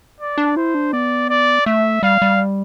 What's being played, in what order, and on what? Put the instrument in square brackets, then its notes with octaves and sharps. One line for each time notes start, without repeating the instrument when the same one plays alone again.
[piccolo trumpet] D5
[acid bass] D4
[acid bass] E4 [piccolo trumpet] C5
[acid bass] D4
[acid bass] B3 [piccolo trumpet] D5
[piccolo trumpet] D5
[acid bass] A3 [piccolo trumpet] E5
[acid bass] G3 [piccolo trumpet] F5
[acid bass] G3